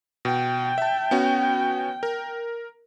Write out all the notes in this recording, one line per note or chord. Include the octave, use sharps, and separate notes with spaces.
B2 G5
E5 A5
B3 C#4 F#4
A#4